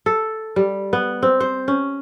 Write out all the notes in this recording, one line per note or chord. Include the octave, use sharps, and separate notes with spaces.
A4
G3
B3
C4
C5
C#4